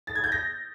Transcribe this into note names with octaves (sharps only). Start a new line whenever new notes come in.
A6
G#6
G6
A#6